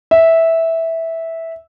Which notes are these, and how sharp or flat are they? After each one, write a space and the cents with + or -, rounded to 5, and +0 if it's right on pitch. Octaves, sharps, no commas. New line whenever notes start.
E5 -10